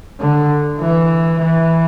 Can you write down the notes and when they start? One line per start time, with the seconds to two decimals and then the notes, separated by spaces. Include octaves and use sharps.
0.20 D3
0.80 E3
1.40 E3